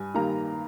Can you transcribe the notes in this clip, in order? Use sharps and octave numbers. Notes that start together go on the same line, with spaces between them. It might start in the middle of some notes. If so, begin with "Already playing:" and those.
Already playing: G2 G#5
D#3 G3 A#3 A#5